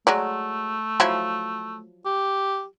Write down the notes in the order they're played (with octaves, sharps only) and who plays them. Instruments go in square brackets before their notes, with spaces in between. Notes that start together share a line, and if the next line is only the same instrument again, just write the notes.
[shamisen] F#3 G#3 D5 [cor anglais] A3
[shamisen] F3 F#3 E4
[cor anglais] G4